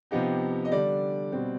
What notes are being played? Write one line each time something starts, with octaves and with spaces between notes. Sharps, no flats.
C3 F3 B3 D#4 G4
D#5
D3 G3 D4 D5
B2 G3 C4